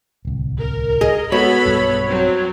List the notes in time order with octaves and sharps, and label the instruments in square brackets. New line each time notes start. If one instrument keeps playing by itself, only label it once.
[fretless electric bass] D1 C2
[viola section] A#4
[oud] G#4 [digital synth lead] D#5
[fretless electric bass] G#3 [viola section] B3 A4 B5 [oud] F#4 [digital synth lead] C#5
[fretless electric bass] B1 G2 G3
[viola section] F#3 C4